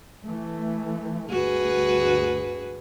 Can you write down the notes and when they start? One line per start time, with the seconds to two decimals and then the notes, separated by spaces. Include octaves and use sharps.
0.24 E3 A3
1.30 D2 G2 F#4 G#4 B4